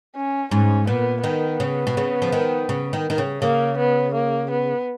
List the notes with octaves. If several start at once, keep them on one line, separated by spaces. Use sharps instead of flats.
C#4
G#2 C#4
A#2 B3
D#3 B3
C#3
B2
C#3
F3
D#3
C#3
D#3
D#3
C#3
C#3 A#3
B3
A#3
B3